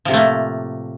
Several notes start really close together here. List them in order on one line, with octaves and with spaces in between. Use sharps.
F3 C3 A2 A3 A#3